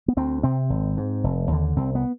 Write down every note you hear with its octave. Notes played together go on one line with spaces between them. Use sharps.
B3
D2 C4
C3 C4
G#1
G#2
F1
D#2 D3
C2 C4
B3